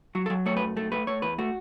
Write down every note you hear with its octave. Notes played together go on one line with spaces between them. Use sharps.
F#3 F#4
A4
F#3
A3 C#5
B4
F#2
A3 A4
A3 B4
A3 C#5
E2 B4
A3 F#4